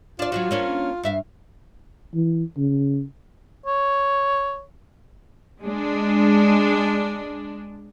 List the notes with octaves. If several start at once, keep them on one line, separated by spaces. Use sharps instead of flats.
D4 F4 D5
F#3 D4 F#4
A#3 C#4 D4
G2 E5 F5
E3
C#3
C#5
G#3 D4